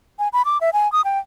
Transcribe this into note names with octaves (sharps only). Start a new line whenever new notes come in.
G#5
B5
D6
E5
G#5
D#6
G5